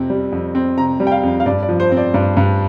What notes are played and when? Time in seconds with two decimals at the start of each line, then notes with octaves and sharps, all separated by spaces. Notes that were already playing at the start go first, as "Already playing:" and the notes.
Already playing: F2 C3 C4
0.10 G3
0.32 F2
0.55 C4
0.78 C3 A#5
1.00 G3
1.07 G5
1.12 F5
1.23 F2
1.40 F5
1.46 G2 D5
1.63 D5
1.69 F3
1.80 C5
1.92 C4
1.97 D5
2.14 G2 D5
2.37 G2